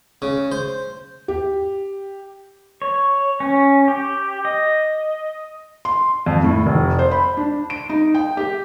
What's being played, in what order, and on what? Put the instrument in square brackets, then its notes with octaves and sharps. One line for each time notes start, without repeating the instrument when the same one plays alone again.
[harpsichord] C#3
C5
[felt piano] G4
[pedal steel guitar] C#5
C#4
G4
D#5
[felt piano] C6
F2
A2
F1
C5
B5
D4
D7
D#4
G5
G4